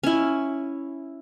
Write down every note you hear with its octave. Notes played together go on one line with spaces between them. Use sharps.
C#4 E4